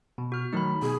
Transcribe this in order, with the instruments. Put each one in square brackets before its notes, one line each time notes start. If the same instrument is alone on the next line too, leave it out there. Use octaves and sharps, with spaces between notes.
[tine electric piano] B2
[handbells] F#4 F6
[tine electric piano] D#3 F#3 A3 [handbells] D#4 B5
[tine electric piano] B2 [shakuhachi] G#4